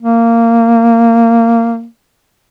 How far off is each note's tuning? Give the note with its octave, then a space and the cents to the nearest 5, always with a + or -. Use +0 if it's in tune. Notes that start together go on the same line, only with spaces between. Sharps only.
A#3 -15